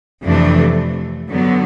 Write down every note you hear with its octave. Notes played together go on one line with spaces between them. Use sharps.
F2 C3 E3 A3 D4
G2 D3 F#3 B3